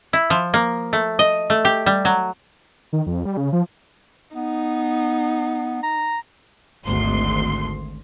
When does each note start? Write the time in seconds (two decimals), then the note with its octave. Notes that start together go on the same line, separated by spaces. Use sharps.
0.13 E4
0.30 F3
0.54 A#3
0.93 A3
1.19 D#5
1.50 A3
1.65 G4
1.86 G3
2.05 F#3
2.93 D#3
3.07 F2
3.25 G3
3.37 C#3
3.53 F3
4.35 B3 D#4
5.83 A#5
6.85 G#1 D2 C6